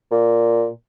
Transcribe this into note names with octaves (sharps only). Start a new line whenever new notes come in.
A#2